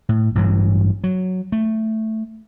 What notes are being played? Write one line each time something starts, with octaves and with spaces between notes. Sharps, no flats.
A2
A1 G2 E3 F#3
F#3
A3